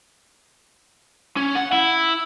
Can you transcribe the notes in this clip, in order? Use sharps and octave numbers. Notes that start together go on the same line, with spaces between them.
C#4
F#5
E4